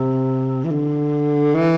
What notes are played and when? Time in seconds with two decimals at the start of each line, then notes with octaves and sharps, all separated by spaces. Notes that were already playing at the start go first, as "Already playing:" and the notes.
Already playing: C3
0.65 E3
0.71 D3
1.55 E3